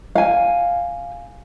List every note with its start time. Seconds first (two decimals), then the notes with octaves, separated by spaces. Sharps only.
0.15 F5 G#5